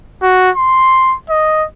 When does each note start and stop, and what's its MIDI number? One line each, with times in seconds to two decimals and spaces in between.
0.22 0.50 66
0.55 1.15 84
1.29 1.65 75